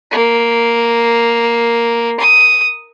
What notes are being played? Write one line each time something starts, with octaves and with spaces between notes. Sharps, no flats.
A#3
D#6